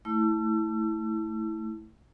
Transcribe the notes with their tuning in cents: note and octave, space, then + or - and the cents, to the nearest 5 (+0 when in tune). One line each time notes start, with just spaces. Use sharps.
A3 +0 E4 -15 E6 +35